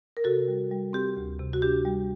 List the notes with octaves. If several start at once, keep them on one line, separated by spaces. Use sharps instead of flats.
A#4
C3 F#4 A4
G3
G3
C4 G4
D2
C3
F#4
D4 G4
G3